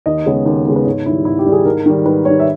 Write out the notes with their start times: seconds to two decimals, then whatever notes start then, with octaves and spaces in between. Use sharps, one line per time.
0.06 D#2 D#5
0.26 C#3 G#3 B3 C#5
0.46 D#2
0.66 C#3 G#3 B3
0.76 B4
0.86 G#2 C#5
1.06 D#3 G3 E4
1.25 G#2 E4
1.39 G4
1.46 D#3 G3
1.52 G#4
1.65 G#2 A#4
1.86 D#3 G3
2.05 G#2 B4
2.25 D#3 G3 C#5
2.40 E5